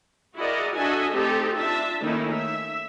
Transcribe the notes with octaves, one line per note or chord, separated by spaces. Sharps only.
E4 F#4 G#4 A#4 D5 D#5
D4 F#4 A4 D#5 E5 G#5
A3 C4 D#4 G4 A4
D4 F4 E5 A5
D#3 A3 A#3 C#4 D#4 E4
E5